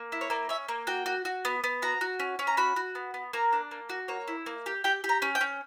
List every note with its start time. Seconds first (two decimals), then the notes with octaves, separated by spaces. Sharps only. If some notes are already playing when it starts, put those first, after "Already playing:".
Already playing: A#3
0.12 E4
0.21 C#5
0.30 A#3 D5
0.49 C#4 E5
0.68 A#3
0.87 F#4 G5
1.06 F#4
1.25 F#4
1.45 B3
1.64 B3
1.82 F#4 A#5
2.01 F#4
2.20 C#4
2.39 C#4
2.47 A#5
2.57 F#4 B5
2.76 F#4
2.95 B3
3.14 B3
3.33 A#3 A#5
3.53 D4
3.71 A#3
3.89 F#4
4.08 A#3 C#5
4.28 E4
4.46 A#3
4.66 G4
4.84 G4 G5
5.04 G4
5.09 A#5
5.22 C#4
5.35 G5
5.41 C#4